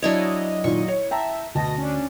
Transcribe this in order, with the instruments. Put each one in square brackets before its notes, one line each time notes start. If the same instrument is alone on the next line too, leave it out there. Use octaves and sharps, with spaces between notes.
[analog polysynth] F#3 D#5 [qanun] D4 E4 C#5
[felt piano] A#2 D#3 [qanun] C#6
[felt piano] C#5
[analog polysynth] E5 [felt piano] G5 A5 A#5
[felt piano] D2 A5 [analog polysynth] B2 D#5 A#6
[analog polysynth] C#4 D4